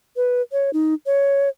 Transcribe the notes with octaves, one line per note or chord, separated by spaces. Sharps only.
B4
C#5
D#4
C#5